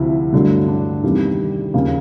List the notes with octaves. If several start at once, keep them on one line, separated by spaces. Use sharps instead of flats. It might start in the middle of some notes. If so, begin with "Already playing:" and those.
Already playing: D2 C3 F3 E4
G2 D3 F#3 A3
D4
E2 C3 D#3 G3 A#3
D#2 C#3 F3 A#3